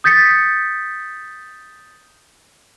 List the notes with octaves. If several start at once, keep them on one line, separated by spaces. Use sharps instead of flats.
D#6 G6 A6 B6 C#7